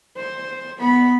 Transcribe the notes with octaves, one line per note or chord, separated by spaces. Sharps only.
C5
B3 B5